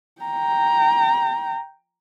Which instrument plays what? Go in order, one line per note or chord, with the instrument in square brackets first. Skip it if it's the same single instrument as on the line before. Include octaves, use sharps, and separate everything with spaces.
[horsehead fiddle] G5 A#5